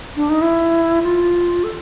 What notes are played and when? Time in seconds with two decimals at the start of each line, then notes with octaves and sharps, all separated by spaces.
0.16 D4
0.30 D#4
0.42 E4
1.03 F4
1.64 A4